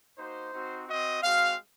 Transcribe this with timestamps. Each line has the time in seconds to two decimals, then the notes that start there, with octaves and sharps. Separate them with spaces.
0.17 A#3 D#4 F#4 C5
0.52 C4 D#4 F#4
0.87 C4 F#4 D#5
1.22 G#3 C4 F#4 F5